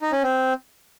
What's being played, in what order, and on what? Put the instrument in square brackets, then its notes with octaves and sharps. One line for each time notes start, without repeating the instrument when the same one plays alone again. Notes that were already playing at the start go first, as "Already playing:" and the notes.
[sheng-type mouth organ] D#4
C#4
C4